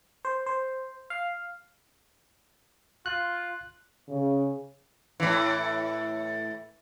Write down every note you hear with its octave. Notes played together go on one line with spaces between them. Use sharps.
C5
C5
F5
F4 F#6
C#3
A2 E3